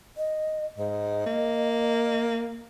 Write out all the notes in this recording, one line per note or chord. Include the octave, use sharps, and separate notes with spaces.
D#5
G#2 D#5
A#3